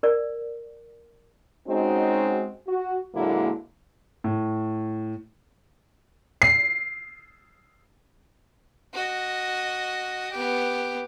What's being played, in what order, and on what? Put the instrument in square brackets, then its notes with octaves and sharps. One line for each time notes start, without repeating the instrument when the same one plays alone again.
[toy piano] A#4 D5
[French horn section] G#3 C4 C#4 D#4 F#4
F#4
A#2 D3 F#3 G#3 A#3 E4
[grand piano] A2
[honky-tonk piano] C7
[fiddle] F#4 D#5
B3 G4